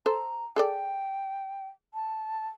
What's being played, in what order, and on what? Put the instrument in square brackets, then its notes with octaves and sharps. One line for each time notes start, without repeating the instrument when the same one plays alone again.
[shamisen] A4 C5 [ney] A#5
[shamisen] G#4 A4 D5 [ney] G5
[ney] A5